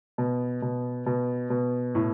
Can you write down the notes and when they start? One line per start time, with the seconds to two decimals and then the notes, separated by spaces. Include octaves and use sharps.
0.18 B2
0.62 B2
1.06 B2
1.50 B2
1.95 A2